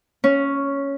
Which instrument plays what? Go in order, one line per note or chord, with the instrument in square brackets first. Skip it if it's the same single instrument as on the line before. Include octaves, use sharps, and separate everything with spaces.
[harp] C#4